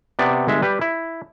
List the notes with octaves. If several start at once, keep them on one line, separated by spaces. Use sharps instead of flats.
C3 B3 D5
G1 G#3 E5
G3 G4 B4
E4